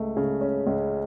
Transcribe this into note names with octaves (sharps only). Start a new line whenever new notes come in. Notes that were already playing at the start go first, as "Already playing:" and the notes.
Already playing: C#2 A3
C#3
C#4
C#2